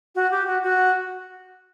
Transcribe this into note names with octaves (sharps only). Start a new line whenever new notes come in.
F#4
G4
F#4
F#4